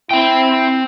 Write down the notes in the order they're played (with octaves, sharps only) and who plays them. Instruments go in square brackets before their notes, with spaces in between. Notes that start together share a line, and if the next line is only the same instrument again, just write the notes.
[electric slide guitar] C4 G5 [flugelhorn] E4